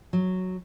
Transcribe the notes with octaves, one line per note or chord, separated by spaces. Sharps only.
F#3